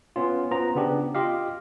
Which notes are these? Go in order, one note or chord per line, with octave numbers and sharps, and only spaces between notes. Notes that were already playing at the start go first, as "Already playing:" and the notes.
B3 C#4 F4
B3 C#4 F4 C5 A#5
C#3 B3 D4 G4
F4 G4 D#5 F5